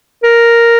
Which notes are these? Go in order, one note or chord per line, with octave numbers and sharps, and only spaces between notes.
A#4